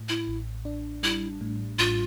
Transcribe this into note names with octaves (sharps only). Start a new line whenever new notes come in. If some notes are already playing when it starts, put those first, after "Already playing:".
Already playing: A2
E4
A1
D4
G3 E4
A2
A1 F4